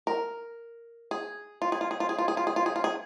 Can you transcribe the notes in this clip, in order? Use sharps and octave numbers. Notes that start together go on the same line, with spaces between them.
A#4
G#4
F4
G#4
F4
G#4
F4
G#4
F4
G#4
F4
G#4
F4
G#4
F4
G#4